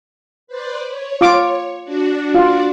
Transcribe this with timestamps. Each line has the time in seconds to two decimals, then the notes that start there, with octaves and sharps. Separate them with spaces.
0.47 B4 C5 D5
0.87 C#5
1.21 F4 D6
1.84 D4 F#4 D5
2.34 F4